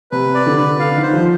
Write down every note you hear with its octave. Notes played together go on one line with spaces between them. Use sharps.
C3 B4
D5
D3
B4
D3 F5
D#3
C5
F3